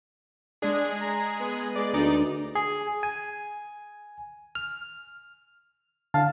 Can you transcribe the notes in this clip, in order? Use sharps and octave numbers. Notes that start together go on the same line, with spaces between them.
G#3 D4 G#4
A#5
B3
G#3 D5
D2 D#4 D5
G#4
G#5
F6
D3 F5 A5